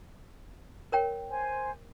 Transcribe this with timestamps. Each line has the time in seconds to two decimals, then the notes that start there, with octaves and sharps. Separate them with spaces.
0.92 A#4 C#5 G5
1.29 C5 G#5